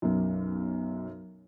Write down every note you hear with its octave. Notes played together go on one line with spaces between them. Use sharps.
B1 F#2